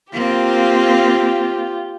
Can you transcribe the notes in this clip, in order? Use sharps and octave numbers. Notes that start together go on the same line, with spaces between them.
A#3 C4 F4 G4